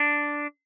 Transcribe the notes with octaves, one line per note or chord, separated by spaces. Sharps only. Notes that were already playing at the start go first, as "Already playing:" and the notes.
Already playing: D4